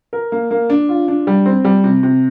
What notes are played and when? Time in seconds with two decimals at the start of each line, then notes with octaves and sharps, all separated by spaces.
0.13 A#4
0.32 A#3
0.51 A#3
0.70 D4
0.89 F4
1.08 D4
1.27 G3
1.46 C4
1.64 G3
1.84 C3
2.03 C3